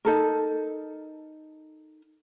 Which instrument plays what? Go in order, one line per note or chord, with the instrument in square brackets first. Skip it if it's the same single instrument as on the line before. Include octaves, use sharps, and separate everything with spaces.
[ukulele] D#4 A4 A#4